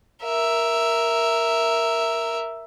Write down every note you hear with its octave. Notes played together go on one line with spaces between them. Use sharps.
A#4 E5